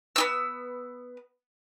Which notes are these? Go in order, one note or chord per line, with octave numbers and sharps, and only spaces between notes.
B3 D#4 E6